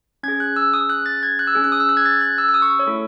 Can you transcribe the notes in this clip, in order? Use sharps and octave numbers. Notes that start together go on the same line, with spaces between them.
C#4 G#4 G#6
F#6
E6
D#6
F#6
A6
G#6
F#6
E6
C#4 G#4
F#6
D#6
E6
F#6
G#6
A6
G#6
F#6
E6
E6
D#6
C#6
C#5
A3 E4 A4